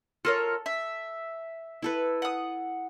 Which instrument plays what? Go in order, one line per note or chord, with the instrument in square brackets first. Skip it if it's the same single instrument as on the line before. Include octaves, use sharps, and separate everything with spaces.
[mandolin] F4 A#4 C#5 [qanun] A4
[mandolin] E5
[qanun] E4 A4 B4
[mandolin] F#5 D#6